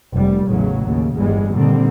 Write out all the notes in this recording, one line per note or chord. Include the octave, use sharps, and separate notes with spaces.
F1 G3
A1 E2 C#3 F#3
D#2 C#3
G1 E2 G3 G#3
A#2 D3 D#3 G3 C4